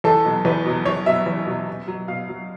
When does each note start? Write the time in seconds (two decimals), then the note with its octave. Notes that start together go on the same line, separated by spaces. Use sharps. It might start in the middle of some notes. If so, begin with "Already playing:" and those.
0.04 E2 A4
0.25 B2 F#3
0.45 E2 B4
0.66 B2 F#3
0.86 E2 C#5
1.06 B2 F#3 E5
1.26 E2
1.47 B2 F#3
1.67 B2
1.87 F#3
2.08 B2 F5
2.29 F#3